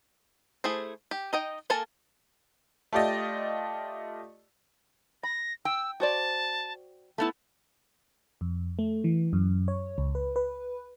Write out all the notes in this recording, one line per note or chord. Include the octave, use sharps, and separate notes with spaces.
A3 E4 G#4 C5
G4
D#4 D#5 G5
A#3 A4 A#4 G#5 A5
A3 F4 G4 D5 D#5
B5 A#6
G5 E6
F#4 C5 D5 A5
A3 B3 E4 A5
F2
A3
E3
F#2
C#5
C#2
B4
B4